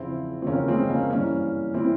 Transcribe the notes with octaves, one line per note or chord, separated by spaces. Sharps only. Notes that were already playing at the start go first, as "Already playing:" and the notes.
Already playing: E2 C#3 F3 C4 E4
C4
E2 C#3 F3 A#3 C#4
G#3 C4
A#3 C#4
G2 E3 A#3 C#4
E3 C4 E4